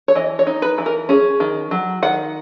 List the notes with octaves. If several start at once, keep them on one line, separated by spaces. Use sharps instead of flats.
C#5
E3 D#5
C#5
D#4
B4
E3
A#4
C#4 G#4
D#3
F#3
D#3 F#5